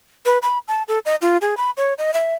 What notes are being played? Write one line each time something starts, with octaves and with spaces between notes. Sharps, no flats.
B4
B5
A5
A4
D#5
F4
G#4
B5
C#5
D#5
E5